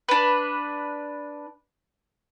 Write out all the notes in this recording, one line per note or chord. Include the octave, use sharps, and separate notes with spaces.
D4 B4